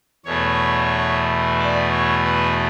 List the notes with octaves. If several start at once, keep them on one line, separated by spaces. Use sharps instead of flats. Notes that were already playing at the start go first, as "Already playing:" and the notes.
E2 B2 A3 C#5
D5
C#5
B4